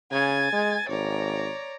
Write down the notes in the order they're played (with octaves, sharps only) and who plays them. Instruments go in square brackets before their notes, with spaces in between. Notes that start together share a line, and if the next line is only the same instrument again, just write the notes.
[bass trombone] C#3 [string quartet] G#5 G#6 A6
[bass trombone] G#3
[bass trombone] G#1 [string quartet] C#5 D5 A#5